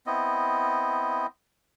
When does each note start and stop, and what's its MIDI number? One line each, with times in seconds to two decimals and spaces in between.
0.07 1.26 59
0.07 1.26 60
0.07 1.26 64
0.07 1.26 75